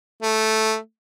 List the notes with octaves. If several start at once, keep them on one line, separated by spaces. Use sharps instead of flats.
A3